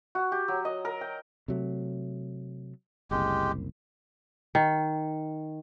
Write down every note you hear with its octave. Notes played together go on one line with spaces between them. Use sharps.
F#4
G4
F#3
D#5
A#4
G5
C3 F#3 A3
F#1 C2 G#3 G4
D#3